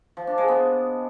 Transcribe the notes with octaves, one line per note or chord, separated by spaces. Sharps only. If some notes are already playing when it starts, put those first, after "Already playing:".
F3
D4
G#3
B3